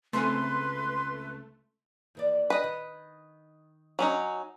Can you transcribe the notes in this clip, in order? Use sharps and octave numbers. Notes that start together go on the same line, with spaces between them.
C#2 A3 C4 B4 G#5 C6
D#2 E3 D5
B4 D#5
D#3
F#3 C#4 D#4